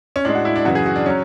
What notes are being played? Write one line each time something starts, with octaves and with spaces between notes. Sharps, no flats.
C#4
A2 G#3 D4
F#4
E4
D4
F#2 C#3 E3 F#4
G#4
F#4
D4
F#3 C#4